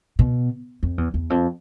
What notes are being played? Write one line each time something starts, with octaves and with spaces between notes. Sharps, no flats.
B2
F2
E2
E2
F2